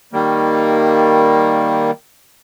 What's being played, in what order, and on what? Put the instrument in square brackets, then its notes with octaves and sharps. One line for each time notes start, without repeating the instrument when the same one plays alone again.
[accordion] D#3 G3 A#3